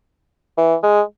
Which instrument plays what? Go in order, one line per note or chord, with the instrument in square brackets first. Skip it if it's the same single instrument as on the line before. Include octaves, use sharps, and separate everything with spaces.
[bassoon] E3
G#3